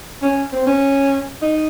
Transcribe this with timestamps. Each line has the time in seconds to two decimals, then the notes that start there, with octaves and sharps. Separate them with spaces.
0.22 C#4
0.53 C4
0.67 C#4
1.42 D#4